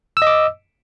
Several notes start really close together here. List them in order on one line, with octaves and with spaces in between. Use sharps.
E6 D#5 D6